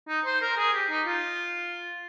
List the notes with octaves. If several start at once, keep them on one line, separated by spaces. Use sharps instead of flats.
D#4
C5
A#4
G#4
G4
D#4
F4